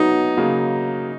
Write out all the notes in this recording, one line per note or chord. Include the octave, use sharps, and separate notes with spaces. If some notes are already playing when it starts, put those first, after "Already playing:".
Already playing: F#3 B3 D#4 F#4
C#3 F#3 A#3